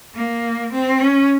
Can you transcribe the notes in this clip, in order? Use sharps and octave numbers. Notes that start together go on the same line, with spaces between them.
A#3
C4
C#4